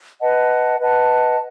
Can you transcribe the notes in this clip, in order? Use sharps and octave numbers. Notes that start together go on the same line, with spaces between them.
B4 D#5 F#5 A5
B4 D#5 F#5 A5